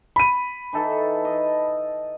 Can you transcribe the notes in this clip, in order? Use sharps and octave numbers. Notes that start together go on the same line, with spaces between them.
B5 D#7
E3 D#4 A4
D#5